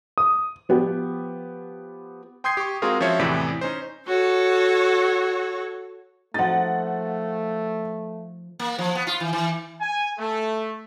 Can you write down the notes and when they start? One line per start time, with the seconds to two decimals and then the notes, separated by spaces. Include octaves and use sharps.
0.18 D#6
0.69 F3 B3 G4
2.44 G5 C6 D#6 G6 G#6 C7
2.57 G4 C#6
2.82 G#3 C4 F4 F#4 G#4 A#4
3.00 F3 C#4 F#4 C#5 E5
3.19 E2 A2 C3 E3 D5 B6
3.61 C#4 D#4 C5
4.07 F#4 A4 C#5
6.34 F3 A3 D#4 F#5 A6
8.59 A#3
8.78 F3
8.95 B3
9.07 F4
9.20 E3
9.33 E3
9.80 G#5
10.18 A3